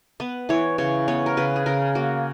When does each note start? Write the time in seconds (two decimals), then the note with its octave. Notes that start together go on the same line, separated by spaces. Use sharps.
0.20 B3 B4
0.49 E3 C#5
0.78 C#3 C#5
1.08 B3 C#5
1.26 A#4
1.37 C#3 B4
1.56 G#4
1.66 C#3 A#4
1.95 A#3 F#4